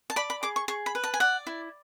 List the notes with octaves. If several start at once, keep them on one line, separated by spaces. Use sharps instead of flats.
A5
D5 B5
B5
G#4 D6
C#6
G#4 C#6
B5
B4
A5
G#5
D5 F#5
E4